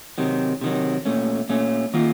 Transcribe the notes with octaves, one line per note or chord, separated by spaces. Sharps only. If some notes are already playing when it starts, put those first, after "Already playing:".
C3 D#3 F#3
C3 D#3 F#3
A#2 A3 C#4
A#2 A3 C#4
D#3 A#3 F4